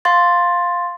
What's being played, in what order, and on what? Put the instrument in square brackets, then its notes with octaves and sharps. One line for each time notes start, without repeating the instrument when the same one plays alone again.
[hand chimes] F5 C6 A6